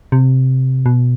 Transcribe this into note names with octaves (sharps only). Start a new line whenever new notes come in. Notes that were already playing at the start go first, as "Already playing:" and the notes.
C3
B2